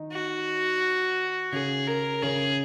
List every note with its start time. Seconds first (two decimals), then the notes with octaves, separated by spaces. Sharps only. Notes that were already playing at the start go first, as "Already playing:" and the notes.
Already playing: D#3 D#4
0.12 F#4
1.52 C#3 C#4 G#4
1.88 A#4
2.22 C#3 C#4 G#4